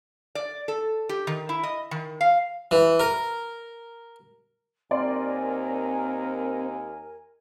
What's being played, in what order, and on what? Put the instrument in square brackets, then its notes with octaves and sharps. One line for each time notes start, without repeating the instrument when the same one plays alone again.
[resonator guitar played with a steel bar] D5
A4
G4
D#3
E4
D#5
D#3
F5
[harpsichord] E3
A#4
[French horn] D#2 [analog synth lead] C4 [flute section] A#4 G#5 [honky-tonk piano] D5 C6